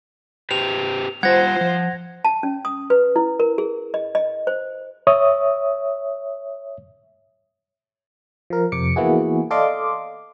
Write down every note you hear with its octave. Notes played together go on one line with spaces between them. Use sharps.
G4 B4 C5 F7
G3 F4 C5 F#5 G#6 A#6
F3
A5
C#4
D#6
B4
E4
A#4
G#4
D#5
D#5
C5
C#5 E5 D#6
F3 A#4
F2 C3 D6 C#7
E3 A#3 B3 E4 F#4 G#4
A4 D5 D#5 F5 C6 D6